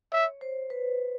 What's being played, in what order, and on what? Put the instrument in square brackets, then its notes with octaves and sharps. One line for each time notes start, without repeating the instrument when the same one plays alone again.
[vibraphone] C#5 [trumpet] E5
[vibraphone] C5
B4